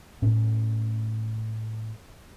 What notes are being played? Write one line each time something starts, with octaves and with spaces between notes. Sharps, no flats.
A2 C#4